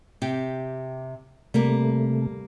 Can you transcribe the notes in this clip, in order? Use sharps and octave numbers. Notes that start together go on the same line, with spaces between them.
C3 G4
C3 G3 A3 A#3 A#4